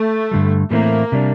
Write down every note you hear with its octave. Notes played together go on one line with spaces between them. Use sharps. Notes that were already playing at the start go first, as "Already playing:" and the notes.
Already playing: A3
G2 D3 G3
A2 E3 A3 A#3 C4 E4
C3 G3 D4